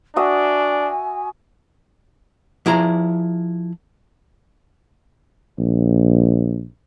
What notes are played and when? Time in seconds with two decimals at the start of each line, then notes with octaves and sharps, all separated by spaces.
0.16 D4 F#4 E5 G#5 D#6
2.66 F3 E4 G#4 A#5
5.58 A#1